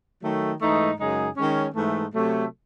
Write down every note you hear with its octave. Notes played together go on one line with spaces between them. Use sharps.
D#3 F#3 A3
G#2 E3 A3 D#4
F#2 C#3 G#3 D#4 G#4
D#3 G#3 C#4
G#2 E3 A3
C3 F#3 A3